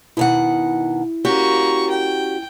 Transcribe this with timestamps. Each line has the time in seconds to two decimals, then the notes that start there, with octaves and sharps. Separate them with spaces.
0.17 B2 D#3 E4 F#5
1.25 A#3 C#4 F#4 G4 C#6
1.90 G5